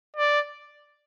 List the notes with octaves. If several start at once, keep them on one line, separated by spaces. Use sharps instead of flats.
D5